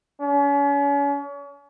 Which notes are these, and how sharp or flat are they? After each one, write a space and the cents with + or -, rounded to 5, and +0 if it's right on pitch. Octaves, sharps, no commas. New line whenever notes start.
C#4 +35